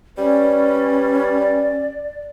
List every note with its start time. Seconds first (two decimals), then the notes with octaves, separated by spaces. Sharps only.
0.18 G3 C#4 B4 D5